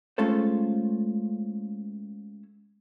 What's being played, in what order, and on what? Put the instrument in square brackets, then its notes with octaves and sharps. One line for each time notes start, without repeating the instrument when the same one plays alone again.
[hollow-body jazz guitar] G#3 A3 C#4 F4 A4 C5